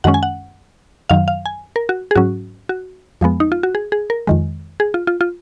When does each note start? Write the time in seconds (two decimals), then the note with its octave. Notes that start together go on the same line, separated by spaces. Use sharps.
0.04 F#2 D#3 G#3 C#4 F#5
0.14 G#5
0.23 F#5
1.09 F#2 D#3 F#3 F5
1.28 F5
1.46 G#5
1.76 A#4
1.89 F#4
2.11 G#4
2.15 G#2 F#3 C#4 F#4
2.69 F#4
3.21 F2 F3 G#3 B3
3.40 D#4
3.52 F4
3.63 F#4
3.75 G#4
3.92 G#4
4.10 A#4
4.27 F2 D#3 G#3
4.80 G#4
4.94 F4
5.07 F4
5.21 F4